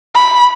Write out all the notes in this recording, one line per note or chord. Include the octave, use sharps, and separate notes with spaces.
B5